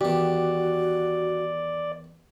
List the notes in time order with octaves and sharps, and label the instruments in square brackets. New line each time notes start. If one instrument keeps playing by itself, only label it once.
[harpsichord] E2 D#3 [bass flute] F#4 [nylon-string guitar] G4 [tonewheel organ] D5